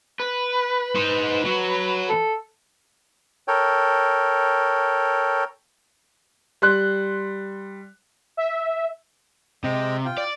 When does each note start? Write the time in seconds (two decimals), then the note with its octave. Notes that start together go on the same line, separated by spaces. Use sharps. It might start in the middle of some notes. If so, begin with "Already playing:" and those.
0.20 B4
0.95 D#4 C5
1.44 F#3 F#4
2.09 A4
3.48 A4 A#4 C#5 G5
6.62 G3 C6 F#6
8.37 E5
9.64 C3 G#3 D#5 G5
10.05 F4 G5
10.18 D5